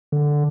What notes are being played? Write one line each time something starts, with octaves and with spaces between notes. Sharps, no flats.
D3